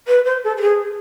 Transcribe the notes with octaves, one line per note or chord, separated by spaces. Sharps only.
B4
C5
A4
A4
G#4